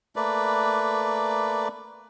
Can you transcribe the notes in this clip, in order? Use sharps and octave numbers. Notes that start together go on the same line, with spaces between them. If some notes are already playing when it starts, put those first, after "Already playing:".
A3 A#3 B4 D5